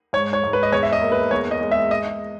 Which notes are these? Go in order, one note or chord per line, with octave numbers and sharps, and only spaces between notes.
G#2 C#5
C#5
G#2
B4
D#5
E2 C#5
E5
D#5
A#3
B4
E2 C#5
D#5
G#3
E5
D#5